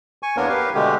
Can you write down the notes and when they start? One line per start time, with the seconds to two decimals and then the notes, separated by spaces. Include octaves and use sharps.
0.23 G#5 C#6
0.37 E2 A#3 B3 D4 A#4 C#5
0.49 G4 A#4 B4 F5
0.75 B2 D3 G#3 A3 G4